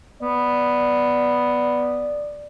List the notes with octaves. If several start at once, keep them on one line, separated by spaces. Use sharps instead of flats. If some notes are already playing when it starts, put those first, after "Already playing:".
B3 D5